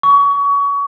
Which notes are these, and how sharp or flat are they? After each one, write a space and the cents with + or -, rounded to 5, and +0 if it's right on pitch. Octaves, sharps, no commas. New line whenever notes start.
C#6 +30